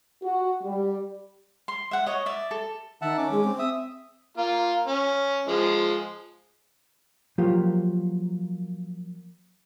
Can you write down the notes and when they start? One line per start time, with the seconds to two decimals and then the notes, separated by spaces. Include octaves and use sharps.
0.23 F#4
0.63 G3
1.68 C6
1.91 E5 F#5
2.06 C#5 D#5
2.26 D5 E5
2.51 A4
3.01 D#3 E5 F#5 A5
3.18 C#4 D6
3.31 G#3
3.44 C4
3.59 E5 D#6
4.38 A#3 F4
4.87 C#4
5.48 F3 G#3
7.38 F3 F#3 A#3 F4 G4